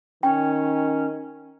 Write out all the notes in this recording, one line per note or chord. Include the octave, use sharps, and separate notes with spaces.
D#3 C#4 G5